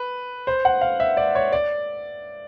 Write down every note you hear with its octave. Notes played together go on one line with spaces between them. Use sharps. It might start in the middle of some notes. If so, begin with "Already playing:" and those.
Already playing: B4
C5
F#5
F5
E5
D5
C#5
D5